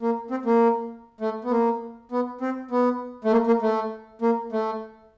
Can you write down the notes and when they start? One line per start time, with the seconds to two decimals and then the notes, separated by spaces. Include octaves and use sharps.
0.01 A#3
0.31 C4
0.45 A#3
1.21 A3
1.44 B3
1.51 A#3
2.11 B3
2.41 C4
2.71 B3
3.24 A3
3.32 A#3
3.47 A#3
3.62 A3
4.22 A#3
4.52 A3